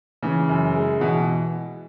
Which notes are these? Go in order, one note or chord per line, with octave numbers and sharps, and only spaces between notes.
C#3 E3
F#2
G#3
B2 E3